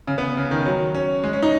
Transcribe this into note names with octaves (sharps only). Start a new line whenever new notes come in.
C#3
B3
C#3
D#3
F#3
C#4
G#3
C#4
D#4